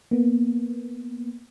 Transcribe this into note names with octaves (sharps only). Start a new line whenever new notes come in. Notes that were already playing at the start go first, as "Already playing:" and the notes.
A#3 B3